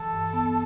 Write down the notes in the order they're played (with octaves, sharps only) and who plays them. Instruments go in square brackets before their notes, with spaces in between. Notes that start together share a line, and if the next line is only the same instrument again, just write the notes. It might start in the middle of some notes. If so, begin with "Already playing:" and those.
Already playing: [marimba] E3 [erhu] A4
[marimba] G2
B3